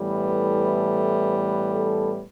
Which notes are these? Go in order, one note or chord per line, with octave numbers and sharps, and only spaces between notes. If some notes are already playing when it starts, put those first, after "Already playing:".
Already playing: A2 E3 G3 B3
A4
B4
A4